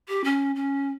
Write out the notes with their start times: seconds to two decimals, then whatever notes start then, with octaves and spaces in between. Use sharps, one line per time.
0.08 G4
0.24 C#4
0.55 C#4